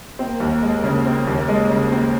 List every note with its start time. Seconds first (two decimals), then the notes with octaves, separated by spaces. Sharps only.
0.19 A#3 C4
0.40 D#2
0.63 G#3
0.84 C#3
1.06 C4
1.27 D#2
1.49 G#3
1.70 C#3
1.92 C4